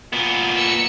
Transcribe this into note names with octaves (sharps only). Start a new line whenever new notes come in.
A#2 B3
E6 C#7